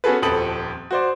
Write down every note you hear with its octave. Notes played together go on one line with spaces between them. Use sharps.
B3 C#4 F#4 G#4 A4 B4
D#1 F2 A4 B5 D#6 F#7
F#4 C5 D5